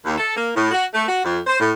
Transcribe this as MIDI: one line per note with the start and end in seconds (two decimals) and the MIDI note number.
0.04 0.16 39
0.17 0.34 69
0.36 0.49 58
0.54 0.68 45
0.71 0.85 66
0.93 1.04 57
1.09 1.23 66
1.24 1.39 41
1.47 1.59 72
1.59 1.70 45